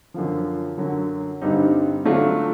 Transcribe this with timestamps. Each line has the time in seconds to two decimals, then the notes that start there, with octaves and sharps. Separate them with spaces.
0.14 F#2 D3 F3
0.78 F#2 D3 F#3
1.41 G2 D3 G3 C4 D#4
2.05 D3 F#3 A3 D4 F4